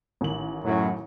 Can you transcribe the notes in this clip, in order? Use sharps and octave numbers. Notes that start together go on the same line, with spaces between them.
A1 D#3 F#7
F#2 A2 F#3